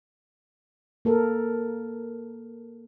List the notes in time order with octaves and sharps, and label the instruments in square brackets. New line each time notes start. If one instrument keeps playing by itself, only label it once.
[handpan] A#3 A4 A#4